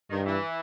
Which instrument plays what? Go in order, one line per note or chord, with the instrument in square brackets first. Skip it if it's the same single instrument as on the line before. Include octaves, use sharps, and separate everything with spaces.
[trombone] G2 [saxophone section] D#3
[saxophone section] E3